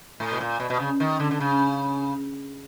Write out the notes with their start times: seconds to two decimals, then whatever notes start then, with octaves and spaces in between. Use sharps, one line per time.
0.20 A2
0.32 B2
0.40 A#2
0.60 B2
0.70 B2
0.80 C#3
1.00 D#3
1.20 D3
1.31 D3
1.40 C#3